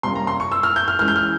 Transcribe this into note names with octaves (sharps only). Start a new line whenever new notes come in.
C3 G3 A#3 C#4 C6
A#5
C6
C#6
E6
F6
G6
F6
E3 G#3 C#4 F6
G6
F6